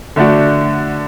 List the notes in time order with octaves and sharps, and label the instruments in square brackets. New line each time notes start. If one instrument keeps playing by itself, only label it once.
[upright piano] D3 A3 D4 F#4